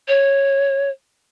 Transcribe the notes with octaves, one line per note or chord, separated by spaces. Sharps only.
C#5